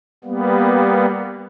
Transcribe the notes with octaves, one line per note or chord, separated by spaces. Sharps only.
G3 A#3 B3